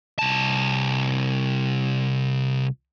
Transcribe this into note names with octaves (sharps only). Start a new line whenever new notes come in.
C2 A5